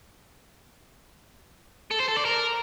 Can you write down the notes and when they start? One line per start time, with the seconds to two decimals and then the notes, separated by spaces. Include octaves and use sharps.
1.91 A4
1.99 C5
2.08 A4
2.16 D5
2.25 A#4